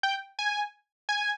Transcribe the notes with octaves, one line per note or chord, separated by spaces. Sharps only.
G5
G#5
G#5